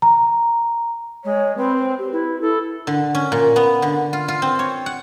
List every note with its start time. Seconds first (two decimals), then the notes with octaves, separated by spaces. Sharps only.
0.02 A#5
1.24 G#3 C#5
1.57 C4 B4
1.79 C5
1.98 G4
2.12 E4 B4
2.41 E4 A4
2.87 D3
3.15 C#4
3.32 A#2
3.56 B3
3.82 D3
4.13 F4
4.28 F4
4.42 C4
4.59 C#5
4.86 F#5